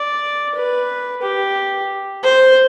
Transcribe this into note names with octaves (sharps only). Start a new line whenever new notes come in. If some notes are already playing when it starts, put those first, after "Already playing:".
Already playing: D5
B4
G4
C5